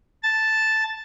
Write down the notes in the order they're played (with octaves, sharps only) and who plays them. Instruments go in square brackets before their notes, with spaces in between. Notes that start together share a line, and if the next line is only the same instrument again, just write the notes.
[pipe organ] A5 A6